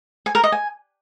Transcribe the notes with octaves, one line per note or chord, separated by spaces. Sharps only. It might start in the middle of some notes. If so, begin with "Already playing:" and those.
G#5
A#4
D#5
G#5